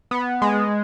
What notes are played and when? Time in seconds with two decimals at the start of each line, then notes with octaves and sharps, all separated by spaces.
0.11 B3
0.42 G#3